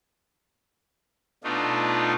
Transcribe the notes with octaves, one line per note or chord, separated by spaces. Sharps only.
B2 A3 D4 D#4 F4